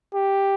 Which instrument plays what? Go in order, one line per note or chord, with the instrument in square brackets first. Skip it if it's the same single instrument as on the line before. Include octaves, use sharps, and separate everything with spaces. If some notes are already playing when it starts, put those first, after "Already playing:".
[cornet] G4